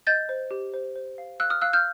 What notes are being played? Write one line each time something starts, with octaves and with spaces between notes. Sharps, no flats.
D#5 G6 A6
C5
G4
C5
C5
F5
F5 E6 F#6
D#6 F6
F5 E6 F#6
F6 G6